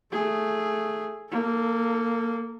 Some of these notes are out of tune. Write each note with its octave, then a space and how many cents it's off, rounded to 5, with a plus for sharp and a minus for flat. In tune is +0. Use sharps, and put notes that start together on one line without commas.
A3 +0 G#4 +0
A#3 -10 A4 +20